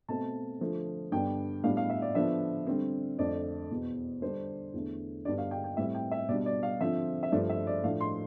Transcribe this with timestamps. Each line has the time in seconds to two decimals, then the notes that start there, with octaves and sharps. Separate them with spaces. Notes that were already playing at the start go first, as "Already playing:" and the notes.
0.09 B2 A3 C4 A5
0.60 D3 F3 A3
1.12 G2 D3 G3 B3 D4 G5
1.64 A2 G3 B3 D4 F5
1.77 F5
1.90 E5
2.02 D5
2.15 D3 F3 B3 D4 E5
2.67 D3 G3 C4
3.18 F2 D3 A3 D4 D5
3.70 E2 B2 B3
4.22 D3 G3 D4 C5
4.73 E2 D3 A3
5.25 G2 D3 G3 B3 D4 D5
5.38 F5
5.51 G5
5.64 G5
5.77 A2 G3 C4 E5
5.95 G5
6.12 E5
6.29 B2 G3 D4 D5
6.46 D5
6.63 F5
6.81 D3 F3 C4 E5
7.23 E5
7.32 G2 F3 A3 D5
7.50 E5
7.67 D5
7.84 A2 F3 A3 D4 F5
8.01 C6